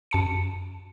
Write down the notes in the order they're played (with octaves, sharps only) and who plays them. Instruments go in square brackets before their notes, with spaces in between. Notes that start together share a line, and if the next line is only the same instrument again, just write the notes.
[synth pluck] F#2 A5 C#7